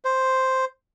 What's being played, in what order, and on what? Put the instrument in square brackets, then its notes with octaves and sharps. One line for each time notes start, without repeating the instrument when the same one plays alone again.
[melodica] C5